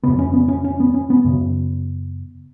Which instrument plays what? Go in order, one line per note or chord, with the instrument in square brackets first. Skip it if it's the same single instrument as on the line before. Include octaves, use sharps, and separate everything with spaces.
[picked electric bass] F2 C#3 B3
C#4
B3
C#4
C#4
B3
C#4
B3
F#2 C#3